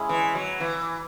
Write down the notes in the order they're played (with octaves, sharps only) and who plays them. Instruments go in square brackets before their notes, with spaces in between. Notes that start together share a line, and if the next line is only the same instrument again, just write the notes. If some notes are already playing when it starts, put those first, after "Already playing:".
Already playing: [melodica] G#3 C#4 E4 G#4
[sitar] E3
F#3
E3